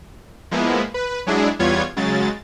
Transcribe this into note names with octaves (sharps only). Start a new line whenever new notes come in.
F3 G#3 A#3 B3 E4
B4
F#3 G#3 D4 E4 G#4
E2 G3 B3 F4 C#5 G#6
C#3 F#3 G#3 A6